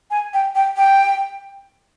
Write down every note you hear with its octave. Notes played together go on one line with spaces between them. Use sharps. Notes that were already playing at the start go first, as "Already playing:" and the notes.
G#5
G5
G5
G5